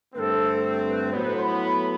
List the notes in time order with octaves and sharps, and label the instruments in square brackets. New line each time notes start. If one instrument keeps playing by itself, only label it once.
[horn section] G2 D3 A3 C4 [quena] A4 B4
[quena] B4
[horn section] A2 F#3 B3 [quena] C5 D5
[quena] C6
B5
B5